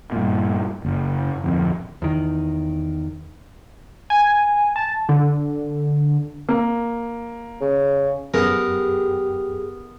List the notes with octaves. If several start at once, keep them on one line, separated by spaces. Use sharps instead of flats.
G2 A#2
F#1
D1 F2
E2 D#3
G#5
A5
D3
A#3
C#3
F#2 B3 G4 G#4 A#4